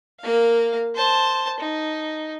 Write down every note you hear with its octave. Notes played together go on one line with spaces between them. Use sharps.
A#3 F5
C5 A5
D#4